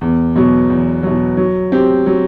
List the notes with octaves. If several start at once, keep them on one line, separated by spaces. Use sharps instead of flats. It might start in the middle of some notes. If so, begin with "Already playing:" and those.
E2
B2 F#3
E2
B2 F#3
F#3
C4 G4
F#3